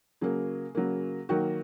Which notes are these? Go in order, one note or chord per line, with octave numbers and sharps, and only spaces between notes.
C#3 F#3 A#3 G#4
C#3 F#3 A#3
D#3 F#3 A#3 F#4